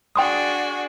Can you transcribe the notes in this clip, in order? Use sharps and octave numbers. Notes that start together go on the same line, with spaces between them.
D4 F#4 G#4 G5 C6 D#6